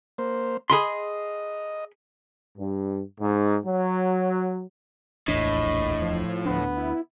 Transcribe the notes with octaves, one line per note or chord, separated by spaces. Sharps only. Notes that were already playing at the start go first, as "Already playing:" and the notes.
A#3 C5
G#4 D#5 B5 C6
G2
G#2
F#3
D1 A#1 E2 A2 D4 D#5
F3
D2 B3 D4
E4